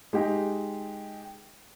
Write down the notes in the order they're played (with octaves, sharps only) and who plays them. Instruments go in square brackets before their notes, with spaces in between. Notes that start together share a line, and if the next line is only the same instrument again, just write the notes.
[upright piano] G#3 D#4 G4